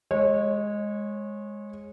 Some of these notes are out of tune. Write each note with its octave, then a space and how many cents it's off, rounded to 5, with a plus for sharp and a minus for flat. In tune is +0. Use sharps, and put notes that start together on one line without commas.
G#3 +0 C#5 -25